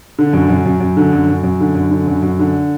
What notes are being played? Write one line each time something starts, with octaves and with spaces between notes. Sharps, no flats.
D3
F#2
F#2
F#2
F#2
D3
F#2
F#2
F#2
D3
F#2
D3
F#2
F#2
D3